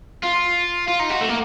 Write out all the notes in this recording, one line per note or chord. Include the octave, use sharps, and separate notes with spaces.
F4
F4
D#4
F#4
A3
A#3